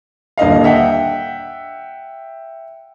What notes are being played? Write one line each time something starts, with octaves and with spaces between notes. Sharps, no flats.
D#1 D3 D#5 F5
E5 F#5 G5